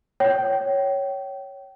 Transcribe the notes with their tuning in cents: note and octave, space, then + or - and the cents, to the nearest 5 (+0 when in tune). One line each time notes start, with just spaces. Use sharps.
C#5 +0 G5 -30